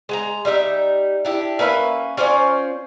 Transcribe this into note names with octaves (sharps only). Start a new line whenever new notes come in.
G#3 G#5 A#5
G3 D#4 E4 E5
D4 E4 G4
A#3 C#4 B4 E5
C#4 F4 C5 D5